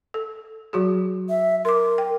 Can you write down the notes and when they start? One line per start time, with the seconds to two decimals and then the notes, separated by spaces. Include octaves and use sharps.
0.14 A4
0.73 F#3 F#4 G#4
1.29 E5
1.65 A#4 C6 D6
1.98 G5